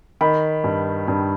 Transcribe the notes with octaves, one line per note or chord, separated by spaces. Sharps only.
D#3 B5
G2
G2